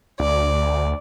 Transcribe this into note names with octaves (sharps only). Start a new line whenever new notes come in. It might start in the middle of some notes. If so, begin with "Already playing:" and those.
D2 D5